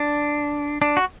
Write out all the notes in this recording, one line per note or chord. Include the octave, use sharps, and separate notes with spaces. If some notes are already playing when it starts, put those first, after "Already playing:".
Already playing: D4
D4
F#4